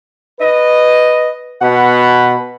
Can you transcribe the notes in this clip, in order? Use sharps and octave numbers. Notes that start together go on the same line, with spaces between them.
B4 D#5
B2 F#5 B5